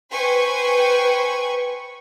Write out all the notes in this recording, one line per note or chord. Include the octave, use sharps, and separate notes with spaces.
B4 C5 G5 G#5 C#6